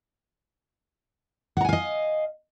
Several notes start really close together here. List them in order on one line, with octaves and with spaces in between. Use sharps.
F#5 A#5 G#5 F5 D#5